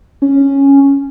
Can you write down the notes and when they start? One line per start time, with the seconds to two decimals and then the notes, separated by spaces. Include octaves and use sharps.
0.22 C#4